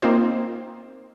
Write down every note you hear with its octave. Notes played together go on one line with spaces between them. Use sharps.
A#3 C4 D#4 F4 C5